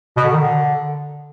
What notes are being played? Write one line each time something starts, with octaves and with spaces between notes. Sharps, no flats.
B2
D3
D#3
D3